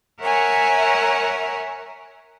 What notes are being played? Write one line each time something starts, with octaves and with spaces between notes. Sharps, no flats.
A#4 C#5 E5 F#5 G#5 A#5